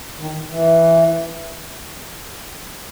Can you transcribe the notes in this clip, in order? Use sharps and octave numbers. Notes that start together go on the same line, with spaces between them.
D#3
E3